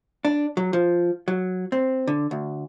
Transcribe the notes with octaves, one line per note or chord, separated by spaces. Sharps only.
D4
F#3
F3
F#3
C4
D3
D2